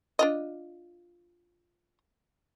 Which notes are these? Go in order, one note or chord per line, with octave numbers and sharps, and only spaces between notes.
D4 F4 D#5